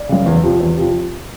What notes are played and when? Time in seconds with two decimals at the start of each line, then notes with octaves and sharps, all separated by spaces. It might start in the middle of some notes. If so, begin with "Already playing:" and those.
Already playing: D5
0.09 F#2 C#3
0.26 E2
0.43 C3 F3
0.60 E2
0.77 C3 F3